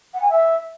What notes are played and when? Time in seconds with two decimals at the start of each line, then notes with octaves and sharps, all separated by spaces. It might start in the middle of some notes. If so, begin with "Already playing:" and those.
0.14 F#5
0.22 G#5
0.29 E5